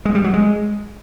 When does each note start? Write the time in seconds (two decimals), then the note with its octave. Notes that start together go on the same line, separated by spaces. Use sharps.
0.05 G#3
0.15 G3
0.24 F#3
0.34 G#3